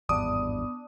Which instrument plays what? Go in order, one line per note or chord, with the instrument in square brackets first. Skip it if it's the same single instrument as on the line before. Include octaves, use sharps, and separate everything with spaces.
[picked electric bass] G#1 E2 G2 [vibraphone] B3 [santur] D4 [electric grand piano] D#6